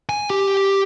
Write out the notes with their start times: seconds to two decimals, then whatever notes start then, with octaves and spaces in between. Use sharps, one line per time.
0.09 G#5
0.30 G4